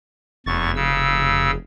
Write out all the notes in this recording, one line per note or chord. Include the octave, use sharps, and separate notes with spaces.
F1 E2 C#6 A6
C#3 E6